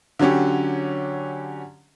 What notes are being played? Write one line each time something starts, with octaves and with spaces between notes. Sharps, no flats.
D3 F#3 C#4 G4